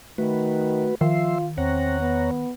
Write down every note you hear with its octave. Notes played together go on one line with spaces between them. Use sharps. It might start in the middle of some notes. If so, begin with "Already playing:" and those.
D#3 A3 F#4 B4
D#3 F3 F4 E5 C6
E2 C4 C#5 F#5 A#5
B3